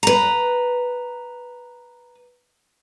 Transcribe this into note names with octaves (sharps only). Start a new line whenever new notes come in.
B4 A#5